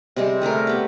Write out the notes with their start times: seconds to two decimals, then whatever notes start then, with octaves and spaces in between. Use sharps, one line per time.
0.16 C3 G3 G#3 C4
0.42 G3 A3 G#4 A#4
0.67 B3 G4